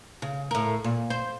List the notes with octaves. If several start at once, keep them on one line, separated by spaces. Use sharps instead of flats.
C#3
A2 A#4
A#2
C5